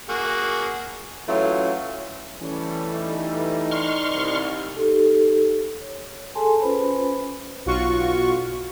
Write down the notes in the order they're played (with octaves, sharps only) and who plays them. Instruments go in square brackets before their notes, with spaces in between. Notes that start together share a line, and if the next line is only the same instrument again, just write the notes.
[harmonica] A#3 F#4 G#4
[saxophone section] E3 F#3 A3 C#4 F4
[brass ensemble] E3 G3 A3 [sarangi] C#4 [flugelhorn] A4
[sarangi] D#4
[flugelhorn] D5 [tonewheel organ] C6 C#6 F6
[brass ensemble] C2
[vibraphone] D#4 G4 A4
C#5
G#4 A4 G#5 A5 C6
C#4 F4 B4 C5 B5
[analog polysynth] B1 F4 F#4 C#6